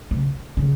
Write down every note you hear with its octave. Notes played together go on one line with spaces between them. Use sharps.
C#3
C#3